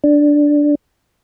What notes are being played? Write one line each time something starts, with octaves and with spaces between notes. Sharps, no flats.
D4